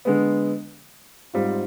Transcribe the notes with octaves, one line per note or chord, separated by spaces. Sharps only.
D3 G#3 B3
G#2 G3 C4 F4